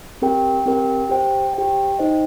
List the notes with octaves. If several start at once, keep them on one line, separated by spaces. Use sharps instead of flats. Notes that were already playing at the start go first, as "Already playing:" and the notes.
C4 G4 A#4 G5
C4 G4 A#4 G5
G4 C5 G5
G4 C5 G5
D#4 C5 D#5 G5